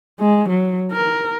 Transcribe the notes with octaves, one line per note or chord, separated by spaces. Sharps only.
G#3
F#3
A#4